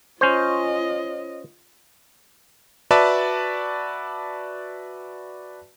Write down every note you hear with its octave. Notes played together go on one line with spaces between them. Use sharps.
C#4 F4 C5 D#5
F#4 B4 D5 E5 A5